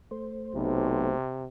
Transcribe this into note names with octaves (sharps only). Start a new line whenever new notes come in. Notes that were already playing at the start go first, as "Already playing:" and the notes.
A3 C5
B1 C3